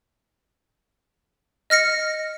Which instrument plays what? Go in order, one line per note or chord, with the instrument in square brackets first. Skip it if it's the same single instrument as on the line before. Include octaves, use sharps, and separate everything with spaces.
[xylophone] D#5 F6 A#6 C#7